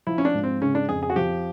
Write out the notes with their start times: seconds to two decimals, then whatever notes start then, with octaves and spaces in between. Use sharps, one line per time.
0.07 F3 E4
0.18 C#4
0.25 D4
0.34 G#2
0.43 C4
0.62 C#3 C#4
0.75 D4
0.89 F2 G#4
1.03 G#4
1.10 F#4
1.16 F3 G4